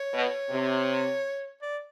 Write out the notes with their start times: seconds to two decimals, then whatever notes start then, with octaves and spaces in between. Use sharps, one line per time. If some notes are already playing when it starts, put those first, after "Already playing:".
Already playing: C#5
0.12 B2
0.50 C3
1.62 D5